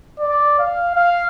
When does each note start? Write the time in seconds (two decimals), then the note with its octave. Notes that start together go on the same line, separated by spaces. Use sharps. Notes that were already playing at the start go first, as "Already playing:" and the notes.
0.20 D5
0.59 F5
0.96 F5